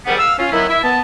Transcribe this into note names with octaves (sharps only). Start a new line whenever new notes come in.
G#2 D#3 G3 B3 F#5
F5 E6
C#4 F4
D#3 F#3 B3 E4
E4 E5
B3 A5